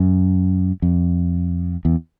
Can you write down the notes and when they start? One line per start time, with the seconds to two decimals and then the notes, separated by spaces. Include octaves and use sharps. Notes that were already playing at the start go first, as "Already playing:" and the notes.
Already playing: F#2
0.82 F2
1.85 E2